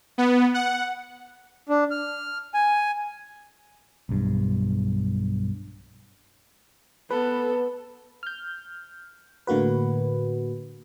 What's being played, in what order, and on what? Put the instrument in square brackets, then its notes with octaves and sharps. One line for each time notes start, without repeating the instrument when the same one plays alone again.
[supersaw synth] B3
F#5
[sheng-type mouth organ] D4
F6
G#5
[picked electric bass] B1 G2
[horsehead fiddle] B3 A4 [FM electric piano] B4
[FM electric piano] F6 G6
A2 D3 A#3 F#4 B4